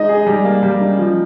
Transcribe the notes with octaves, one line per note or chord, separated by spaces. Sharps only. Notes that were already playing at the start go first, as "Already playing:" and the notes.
Already playing: G#3 D#4 D#5
G#4
G3
A#3
G3
D#4
F3